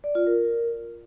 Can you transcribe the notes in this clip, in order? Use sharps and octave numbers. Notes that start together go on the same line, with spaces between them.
D5
F4
A#4